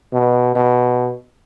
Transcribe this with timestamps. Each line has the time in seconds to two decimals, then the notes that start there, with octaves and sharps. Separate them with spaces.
0.13 B2
0.55 B2